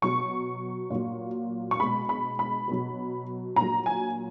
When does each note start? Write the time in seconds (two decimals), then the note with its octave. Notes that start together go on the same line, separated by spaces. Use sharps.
0.02 B2 F#3 C#6
0.90 A#2 F#3
1.71 C#6
1.80 B2 G#3 B5
2.09 B5
2.39 B5
2.68 B2 F#3
3.56 A#2 F#3 A#5
3.86 G#5